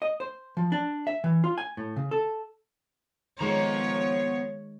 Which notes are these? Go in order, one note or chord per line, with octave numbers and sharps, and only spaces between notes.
D#5
C5
F3
D4
E5
E3
F4
G#5
A2
C#3
A4
D#3 F3 G#3 B3 C#5 A#5